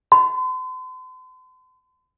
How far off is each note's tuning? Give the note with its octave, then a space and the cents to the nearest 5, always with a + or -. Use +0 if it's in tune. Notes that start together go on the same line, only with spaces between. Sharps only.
C6 -40